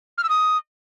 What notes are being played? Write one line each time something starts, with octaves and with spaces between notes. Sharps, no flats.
F6
E6
D#6